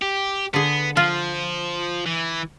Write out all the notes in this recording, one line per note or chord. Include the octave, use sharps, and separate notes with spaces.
G4
D3 B3 G#4
F3 F4
E3